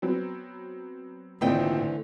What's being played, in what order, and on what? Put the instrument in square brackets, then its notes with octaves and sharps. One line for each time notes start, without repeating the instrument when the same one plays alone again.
[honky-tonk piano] F#3 B3 C4
[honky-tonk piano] G#1 C4 [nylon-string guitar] A#2 D#5 G5 [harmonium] D3 E3 A3